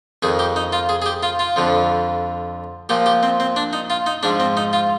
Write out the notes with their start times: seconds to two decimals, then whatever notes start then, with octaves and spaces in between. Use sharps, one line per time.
0.23 F2 D#3 G#4
0.39 G4
0.56 D#4
0.73 F4
0.89 G#4
1.02 G#4
1.06 G4
1.23 F4
1.39 F4
1.56 F2 D3 F3
2.89 A#2 F3 G4
3.06 G4
3.23 C4
3.40 C4
3.56 D4
3.73 D#4
3.90 F4
4.06 D#4
4.23 G#2 F3 D4
4.40 C4
4.57 D#4
4.73 F4